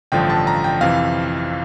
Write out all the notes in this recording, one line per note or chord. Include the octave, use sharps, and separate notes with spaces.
A1 G2 D3 F3 G5
A5
A#5
G5
F2 C3 E3 F5